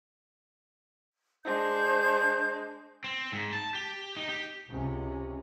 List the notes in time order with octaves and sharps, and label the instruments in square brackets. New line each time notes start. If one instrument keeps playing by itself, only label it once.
[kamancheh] G#3 D4 [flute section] C5 G6
[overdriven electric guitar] C4
G#2
A5
G4
D#4
G4
[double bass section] C#2 C3 C#4